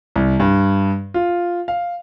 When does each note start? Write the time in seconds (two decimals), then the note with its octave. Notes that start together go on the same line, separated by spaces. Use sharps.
0.16 C2
0.40 G2
1.14 F4
1.68 F5